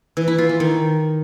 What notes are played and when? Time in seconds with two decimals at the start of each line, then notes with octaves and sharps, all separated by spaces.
0.17 E3
0.28 E4
0.38 F4
0.49 E3
0.60 D#3